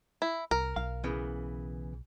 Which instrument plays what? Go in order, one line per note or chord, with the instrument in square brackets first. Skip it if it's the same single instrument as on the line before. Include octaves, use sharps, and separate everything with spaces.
[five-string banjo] E4
[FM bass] C2 [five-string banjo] A#4
[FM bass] B1 [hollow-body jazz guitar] F5
[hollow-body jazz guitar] C#3 E3 B3